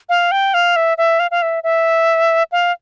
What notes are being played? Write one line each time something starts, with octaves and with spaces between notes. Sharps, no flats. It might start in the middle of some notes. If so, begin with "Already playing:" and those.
F5
G5
F5
E5
E5
F5
F5
E5
E5
F5